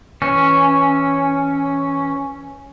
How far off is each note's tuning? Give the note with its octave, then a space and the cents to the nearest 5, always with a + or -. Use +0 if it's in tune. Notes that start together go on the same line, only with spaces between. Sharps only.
E3 +0 C#4 +0